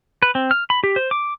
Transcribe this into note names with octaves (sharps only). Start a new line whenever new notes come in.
B4
C4
F6
B5
G4
C5
D6